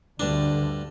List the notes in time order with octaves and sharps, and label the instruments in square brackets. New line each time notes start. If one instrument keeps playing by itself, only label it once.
[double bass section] D2 D3 [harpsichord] G2 D4